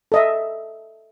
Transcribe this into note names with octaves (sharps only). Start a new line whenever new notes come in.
A4 D#5 E5